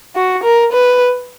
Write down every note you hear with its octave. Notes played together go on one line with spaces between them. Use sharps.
F#4
A#4
B4